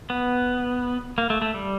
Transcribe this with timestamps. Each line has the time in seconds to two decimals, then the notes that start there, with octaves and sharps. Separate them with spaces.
0.10 B3
1.18 A#3
1.30 A3
1.42 A3
1.54 G3